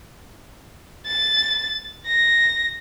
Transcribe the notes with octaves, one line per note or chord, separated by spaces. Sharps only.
A6
A#6